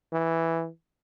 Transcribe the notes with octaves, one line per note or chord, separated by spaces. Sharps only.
E3